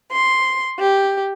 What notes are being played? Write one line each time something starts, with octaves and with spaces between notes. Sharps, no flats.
C6
G4